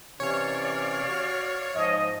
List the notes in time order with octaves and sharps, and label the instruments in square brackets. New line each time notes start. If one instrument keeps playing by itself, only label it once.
[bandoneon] C3 E3 C#4 [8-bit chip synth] C#5 [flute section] D5 F5 F6
[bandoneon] F#4
[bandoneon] G#2 F3 [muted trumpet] D#5